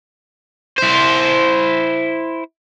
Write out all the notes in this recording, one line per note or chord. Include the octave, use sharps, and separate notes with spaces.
E4 C5